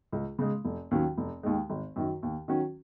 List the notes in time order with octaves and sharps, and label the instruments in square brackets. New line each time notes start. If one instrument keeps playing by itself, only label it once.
[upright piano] C#2
C#3 G#3
F1
D#2 D#3 F#3 C#4
F1
D#2 D#3 G#3
G#1
F#2 D#3 F#3
D#2
D#3 F#3 C#4 F#4